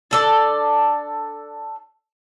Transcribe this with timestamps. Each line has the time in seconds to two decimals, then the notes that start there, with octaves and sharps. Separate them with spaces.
0.11 D4 A4 D5